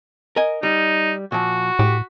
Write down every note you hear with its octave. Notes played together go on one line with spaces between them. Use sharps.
A#4 D#5 G#5
G3 D#4
A#2 F3 F#4
A2 G4